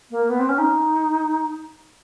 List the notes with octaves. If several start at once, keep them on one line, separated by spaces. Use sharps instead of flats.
A#3
B3
C4
C#4
D#4